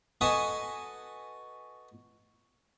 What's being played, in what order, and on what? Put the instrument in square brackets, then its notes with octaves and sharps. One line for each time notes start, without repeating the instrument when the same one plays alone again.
[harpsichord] F#4 A4 B4 D#5 G#5